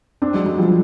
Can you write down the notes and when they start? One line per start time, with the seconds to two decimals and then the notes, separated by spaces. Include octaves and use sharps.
0.22 C4 D4
0.34 F#3 G#3
0.46 F#3 G#3
0.58 F3 G3